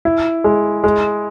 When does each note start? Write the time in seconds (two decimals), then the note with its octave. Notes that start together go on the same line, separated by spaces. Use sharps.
0.05 E4
0.44 G#3
0.84 G#3